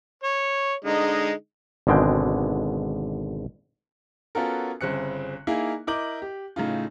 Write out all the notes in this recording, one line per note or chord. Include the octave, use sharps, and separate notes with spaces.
C#5
D3 G#3 D#4
G#1 B2 D3 G#3 G5
B3 C#4 F4 F#4 A4 A#4
G1 C#3 C4 F#6 C#7
A#3 D#4 E4 G#4 A#4
E4 A#4 D#5 D6 G6 F#7
G4
A2 C#3 D#4 F4